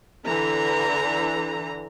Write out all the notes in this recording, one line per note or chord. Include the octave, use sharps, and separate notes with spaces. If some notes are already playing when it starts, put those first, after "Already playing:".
D3 E3 A#5